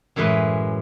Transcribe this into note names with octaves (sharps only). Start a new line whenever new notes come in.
F#2 A2 E3 G#3 B4